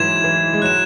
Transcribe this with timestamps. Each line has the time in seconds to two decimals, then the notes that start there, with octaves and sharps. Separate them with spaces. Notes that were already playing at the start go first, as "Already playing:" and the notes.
Already playing: G#2 E3 F#3 G#6 E7
0.24 E3
0.53 G#3
0.62 F#3 F#6 E7